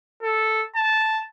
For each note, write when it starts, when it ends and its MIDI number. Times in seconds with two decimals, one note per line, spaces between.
0.23 0.64 69
0.75 1.23 81